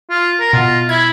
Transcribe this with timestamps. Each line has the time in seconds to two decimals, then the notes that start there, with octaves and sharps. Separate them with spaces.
0.10 F4
0.40 A#4
0.53 B2 F4
0.89 E4 G#6